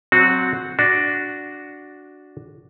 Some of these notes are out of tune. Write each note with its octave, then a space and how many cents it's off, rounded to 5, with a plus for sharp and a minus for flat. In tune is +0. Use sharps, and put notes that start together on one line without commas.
F#3 +0 C4 +0 F#4 -15
D4 +0 F#4 +0